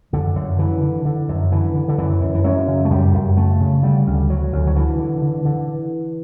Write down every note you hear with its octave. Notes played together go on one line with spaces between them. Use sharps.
F#2 D3
F#2
D3 E3
D3
D3
F#2
D3 E3
D3
D3
F#2 E3
F#2
E3
F#2 F#3
C#3
A3
F#2 G3
F#2
C#3 A3
C#3
D3 G3
D2
D2 F#3
D2
F#3
D3 E3
D3
D3
D3